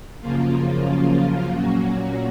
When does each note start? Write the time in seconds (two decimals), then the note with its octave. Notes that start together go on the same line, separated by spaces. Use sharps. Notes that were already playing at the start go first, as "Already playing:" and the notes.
0.21 F#2 C#3 F3 A#3 F4
1.51 A#2 F#3 A#3 C#4 F#4